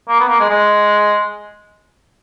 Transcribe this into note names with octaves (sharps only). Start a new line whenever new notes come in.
A#3
B3
A#3
G#3
G#3